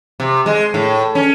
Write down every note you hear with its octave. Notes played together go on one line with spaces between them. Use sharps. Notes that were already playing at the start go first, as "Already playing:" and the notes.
C3
G#3
A2
C#4